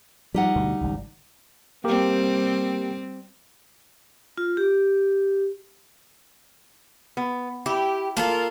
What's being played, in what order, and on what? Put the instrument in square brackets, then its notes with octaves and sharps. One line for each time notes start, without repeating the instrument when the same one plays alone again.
[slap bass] F3 [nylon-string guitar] G3 D#4 F#5
[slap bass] D2 B2 D3
G#1 C#2
[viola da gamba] G3 C4 [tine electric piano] A#3 G4 A#4
[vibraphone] F4
G4
[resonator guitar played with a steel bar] B3
[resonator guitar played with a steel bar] E4 [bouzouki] G4
[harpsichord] A#3 A5 [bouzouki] F4 A4 A#4